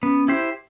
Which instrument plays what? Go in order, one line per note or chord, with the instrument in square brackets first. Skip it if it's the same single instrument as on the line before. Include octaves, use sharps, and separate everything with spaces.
[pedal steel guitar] B3 [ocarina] C#4
[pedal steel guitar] E4 G4 C5